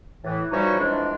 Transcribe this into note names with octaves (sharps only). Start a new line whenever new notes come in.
A2 E3
E3 F3 G3 D#4 F#4 C#5
F2 E3 G#3 D4